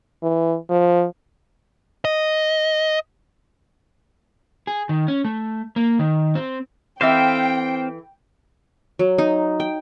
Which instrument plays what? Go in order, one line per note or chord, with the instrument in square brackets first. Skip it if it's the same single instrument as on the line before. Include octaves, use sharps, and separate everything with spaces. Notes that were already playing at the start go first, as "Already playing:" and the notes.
[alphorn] E3
F3
[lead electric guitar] D#5
[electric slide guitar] G#4
D#3
C#4
A3
A#3
D#3
C4
[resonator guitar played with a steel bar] E3 A4 E5 [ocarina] C4 [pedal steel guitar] C5 F5 [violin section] G5
[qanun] F#3
D#4
G5